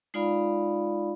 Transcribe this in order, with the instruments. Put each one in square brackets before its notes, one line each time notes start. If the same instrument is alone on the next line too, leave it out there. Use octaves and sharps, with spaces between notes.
[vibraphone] G#3 D#4 F4 D5 F5 B5